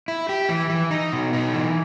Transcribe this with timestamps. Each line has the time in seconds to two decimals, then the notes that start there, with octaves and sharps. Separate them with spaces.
0.08 E4
0.29 G4
0.49 E3
0.70 E3
0.91 D#4
1.13 B2
1.33 D#4
1.54 E3